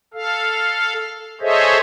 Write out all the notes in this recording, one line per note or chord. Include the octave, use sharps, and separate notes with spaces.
A4 F5
G#4 A4 C5 C#5 D#5 E5